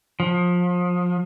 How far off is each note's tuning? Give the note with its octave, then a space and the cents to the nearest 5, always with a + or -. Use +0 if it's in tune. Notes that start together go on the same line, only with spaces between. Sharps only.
F3 +25